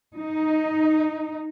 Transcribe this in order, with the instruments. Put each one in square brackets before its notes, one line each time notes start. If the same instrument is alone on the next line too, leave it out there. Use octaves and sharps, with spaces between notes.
[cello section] D#4